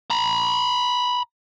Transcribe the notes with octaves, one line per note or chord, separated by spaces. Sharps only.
A#5 B5